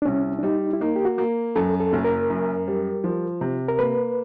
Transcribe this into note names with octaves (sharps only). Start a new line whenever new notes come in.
D4
C2 C#4
D4
G3 D#4
E4
A#3 D#4
G4
F#4
A#3
F#2 A4
A4
F#1
A#4
F#2
G3
F3
C3
A#4
A#3 B4